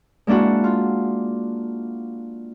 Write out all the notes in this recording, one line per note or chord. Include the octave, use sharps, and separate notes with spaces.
G#3 A#3 D4 E4 F#4
F4